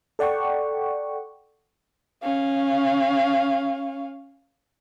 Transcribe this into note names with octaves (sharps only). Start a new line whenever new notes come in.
A4 D5 F#5 G5 C#6
C#4 F5